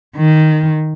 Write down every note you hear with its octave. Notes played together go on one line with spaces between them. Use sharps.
D#3